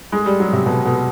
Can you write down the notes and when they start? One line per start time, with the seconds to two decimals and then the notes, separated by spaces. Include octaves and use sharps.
0.12 G#3
0.26 G3
0.40 F#3
0.53 C3
0.66 B2
0.85 B2